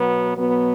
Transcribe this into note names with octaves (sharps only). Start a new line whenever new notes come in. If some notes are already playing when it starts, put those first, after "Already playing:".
Already playing: B2 F#3 B3
B2 F#3 B3